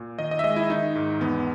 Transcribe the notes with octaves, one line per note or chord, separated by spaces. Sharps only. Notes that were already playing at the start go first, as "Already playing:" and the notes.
Already playing: A#2
D#3 D#5
D#5
E5
G#3 D#5
E4
D#3 D#4
G#2
E2 B3